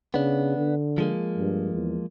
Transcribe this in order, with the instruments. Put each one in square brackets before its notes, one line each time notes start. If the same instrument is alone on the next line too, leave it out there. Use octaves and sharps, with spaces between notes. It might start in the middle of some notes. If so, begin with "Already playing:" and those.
[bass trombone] C#3 [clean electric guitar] B3 D4
[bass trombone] D3
[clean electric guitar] F3 G#3 A#3
[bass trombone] G2
E2